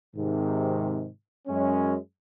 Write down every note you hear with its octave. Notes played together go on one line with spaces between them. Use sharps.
G#2 C3 D#3
F#2 G#3 C#4